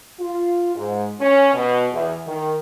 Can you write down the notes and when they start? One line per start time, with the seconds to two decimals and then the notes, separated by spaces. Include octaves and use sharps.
0.20 F4
0.76 G#2
1.20 C#4
1.54 B2
1.92 E2
2.26 D#3